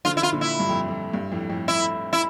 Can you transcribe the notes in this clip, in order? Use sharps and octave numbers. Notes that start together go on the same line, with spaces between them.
D3 F3 F4
E4
F4
A#2 D3
E4
G2
F2
F2
G2
F2 A2
F2 A2
E4
E4